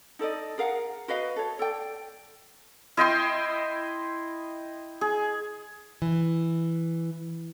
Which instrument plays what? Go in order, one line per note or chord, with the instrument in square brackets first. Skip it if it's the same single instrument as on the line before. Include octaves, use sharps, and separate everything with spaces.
[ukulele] D#4 A4 D5 D#5
G#4 A#4 F5 F#5
F#4 B4 D#5 F5
A4 C#5
A4 D5 G5
[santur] E4 D#5 G5 C6
G#4
[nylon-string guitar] E3